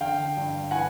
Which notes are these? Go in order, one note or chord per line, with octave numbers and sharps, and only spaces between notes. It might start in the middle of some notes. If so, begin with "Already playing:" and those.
D3 F5 G5
G2
E3 F#5 G#5